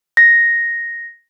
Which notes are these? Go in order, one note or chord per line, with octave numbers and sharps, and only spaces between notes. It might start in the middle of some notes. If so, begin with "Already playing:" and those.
A#6